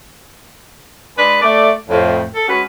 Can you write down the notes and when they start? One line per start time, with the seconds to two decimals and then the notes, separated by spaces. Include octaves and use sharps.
1.17 G#3 D4 B4
1.42 A3 D5
1.88 F2 A2
2.35 A4
2.48 G#3 C#4 F#4 B4